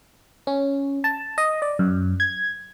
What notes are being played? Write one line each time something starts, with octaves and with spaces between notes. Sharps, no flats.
C#4
A5
D#5
D5
F#2
G#6